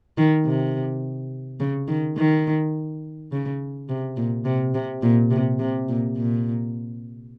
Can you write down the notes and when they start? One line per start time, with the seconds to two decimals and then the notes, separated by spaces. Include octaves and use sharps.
0.18 D#3
0.46 C3
1.60 C#3
1.88 D#3
2.17 D#3
3.32 C#3
3.89 C3
4.17 A#2
4.45 C3
4.75 C3
5.03 A#2
5.31 C3
5.59 C3
5.89 A#2
6.17 A#2